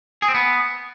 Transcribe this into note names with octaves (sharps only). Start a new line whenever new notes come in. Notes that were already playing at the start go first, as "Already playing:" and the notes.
G#4
C4
B3